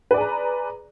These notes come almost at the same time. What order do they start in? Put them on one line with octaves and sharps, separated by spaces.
B4 D5 G#4 A#5